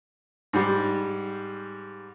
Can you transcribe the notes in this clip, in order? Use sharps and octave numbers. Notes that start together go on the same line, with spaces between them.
G#2 G3